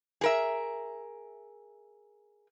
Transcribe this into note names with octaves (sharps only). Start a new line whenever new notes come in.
G#4 A#4 E5